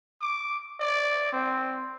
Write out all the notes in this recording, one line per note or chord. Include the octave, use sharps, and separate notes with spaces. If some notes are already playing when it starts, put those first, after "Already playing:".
D6
D5
C4